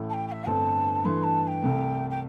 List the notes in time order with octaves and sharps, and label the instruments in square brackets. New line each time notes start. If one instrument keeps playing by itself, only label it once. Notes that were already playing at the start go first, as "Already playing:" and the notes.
Already playing: [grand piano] A1 A2 A3
[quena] A5
G5
G5
E5
[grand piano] G1 G2 D3 A3 C4 [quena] A5
[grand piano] G2 E3 A3 [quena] C6
[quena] A5
A5
G5
[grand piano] C2 C3 A3
[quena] G5